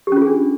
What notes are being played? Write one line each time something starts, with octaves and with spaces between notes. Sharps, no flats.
C#4 D4 F4 G4 G#4